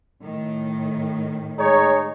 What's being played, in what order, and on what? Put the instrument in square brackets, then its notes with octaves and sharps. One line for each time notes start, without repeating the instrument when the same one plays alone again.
[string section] A2 D#3
[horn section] G#3 C#5 [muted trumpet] D#4 [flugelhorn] G#4